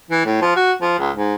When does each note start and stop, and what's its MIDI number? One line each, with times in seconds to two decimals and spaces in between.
0.11 0.24 52
0.26 0.41 45
0.41 0.55 53
0.56 0.73 66
0.81 0.95 53
0.99 1.11 37
1.16 1.35 44